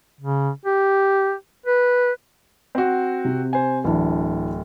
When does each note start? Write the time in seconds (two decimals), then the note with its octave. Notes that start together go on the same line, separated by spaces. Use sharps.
0.20 C#3
0.65 G4
1.66 B4
2.75 C4 F#4
3.25 C3
3.53 C5 G#5
3.84 D1 E3 D4